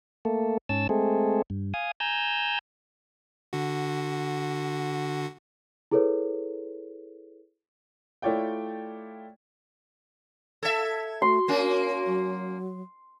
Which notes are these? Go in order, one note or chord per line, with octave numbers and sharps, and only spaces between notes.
A3 A#3 A4
G#2 C#4 A5 E6
G#3 A3 C4 G#4 A4
G2
F5 G#5 D#6
G#5 A#5 E6 G6
D3 F#4
E4 G#4 A4 B4 C#5
A3 E4 F4 C#5 D5 G5
A4 E5 G#6
A3 F#4 C6
A#3 C#4 A#4
F#3